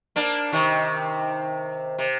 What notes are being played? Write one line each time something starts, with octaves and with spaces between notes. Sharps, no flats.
A#3 D4
C3 D#3
C3